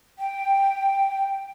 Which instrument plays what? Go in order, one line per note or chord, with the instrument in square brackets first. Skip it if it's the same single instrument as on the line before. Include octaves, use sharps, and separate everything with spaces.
[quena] G5